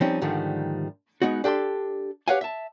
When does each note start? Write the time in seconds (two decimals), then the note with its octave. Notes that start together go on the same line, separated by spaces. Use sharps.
0.01 F3 G3 C4 C#4 D#4
0.22 G#2 D3 D#3 F3 G3 A3
1.22 G#3 B3 D#4 F#4
1.44 D4 G4 A4 G5 C6
2.28 G4 B4 C#5 F5 F#5 G#5
2.41 E5 A5